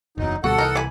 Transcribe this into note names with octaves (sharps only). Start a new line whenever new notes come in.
F#1 E2 F#3 D#4
D2 B2 G3 F#4 A4 F#5
C2 E3 D#4 A#4
D4 G#5 B5